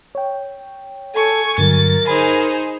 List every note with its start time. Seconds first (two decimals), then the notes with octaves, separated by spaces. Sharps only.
0.15 C#5 G5
1.14 A4 G#5 C#6
1.58 G2 D3 F#3 A#4 A6
2.07 D#4 G#4 C5 B5